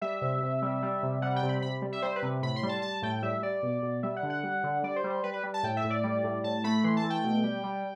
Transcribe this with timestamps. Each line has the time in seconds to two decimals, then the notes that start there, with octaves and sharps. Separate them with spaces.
0.01 G3 E5
0.22 C3
0.42 C3
0.62 G3
0.82 G3
1.03 C3
1.22 G3 F#5
1.36 G5
1.43 C3
1.49 B5
1.62 C3 B5
1.82 G3
1.92 E5
2.02 G3 C5
2.16 B4
2.22 C3
2.42 A2 B5
2.56 C6
2.63 G3
2.69 A5
2.82 G3 A5
3.02 A2 G5
3.22 G3 E5
3.43 G3 D5
3.63 B2
3.83 B2
4.03 G3 E5
4.16 F#5
4.23 D3
4.30 F#5
4.43 G3
4.64 D3
4.83 G3 D5
4.96 C5
5.04 G3
5.10 C5
5.23 G3 B4
5.33 B4
5.43 G3
5.54 A5
5.63 A2 G5
5.77 E5
5.84 A2
5.90 D5
6.04 G3
6.24 A2
6.43 A2 A5
6.64 A3 B5
6.84 E3 C6
6.97 A5
7.04 A3
7.10 G5
7.24 B2
7.43 G3
7.63 G3